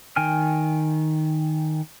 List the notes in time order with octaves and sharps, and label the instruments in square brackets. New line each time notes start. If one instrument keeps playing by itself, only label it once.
[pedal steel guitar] D#3 G5 G#5 F6